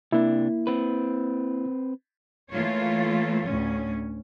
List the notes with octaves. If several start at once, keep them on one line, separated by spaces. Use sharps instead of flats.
C3 A#3 D4 E4
C4 B4
E3 A3 A#3 F4 C#5
D2 A2 C#4